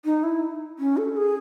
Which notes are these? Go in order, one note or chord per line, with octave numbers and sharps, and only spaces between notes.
D#4
E4
C#4
A4
G#4